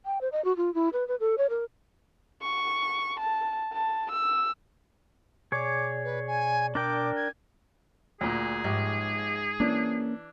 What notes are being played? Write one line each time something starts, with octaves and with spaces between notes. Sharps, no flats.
G5
C5
D#5
F#4
F4
E4
B4
B4
A4
C#5
A#4
C#6
A5
A5
E6
B2 G#4 C#5 D5 D6
B4
G#5
D4 A#4 G5 D6
G#6
D2 A#2 G#4
A#1 G#2 G4
E3 A#3 C#4 D4